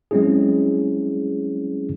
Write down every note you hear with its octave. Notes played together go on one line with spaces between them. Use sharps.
F#3 G#3 C4 C#4 E4 G#4